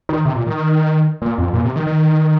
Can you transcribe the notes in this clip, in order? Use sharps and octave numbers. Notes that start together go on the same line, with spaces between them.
D#3
C3
A#2
D#3
A#2
F2
A#2
C3
D#3
D#3